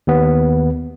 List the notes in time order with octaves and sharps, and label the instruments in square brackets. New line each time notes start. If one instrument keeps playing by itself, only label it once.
[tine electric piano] D#2 B3